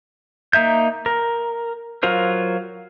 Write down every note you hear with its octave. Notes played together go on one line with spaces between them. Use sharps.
A#3 D#4 E5 G6
A#4
F#3 F4 A#4 C5